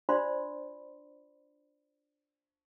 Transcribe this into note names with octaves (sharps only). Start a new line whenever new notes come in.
D4 F4 C5 D5 B5 C6